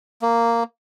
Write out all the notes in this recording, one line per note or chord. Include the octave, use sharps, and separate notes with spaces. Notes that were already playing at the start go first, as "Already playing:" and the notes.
A#3